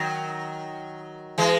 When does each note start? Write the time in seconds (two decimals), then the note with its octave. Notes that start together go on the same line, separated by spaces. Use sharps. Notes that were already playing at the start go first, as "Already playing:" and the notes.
Already playing: D#3 F#3
1.38 E3 G#3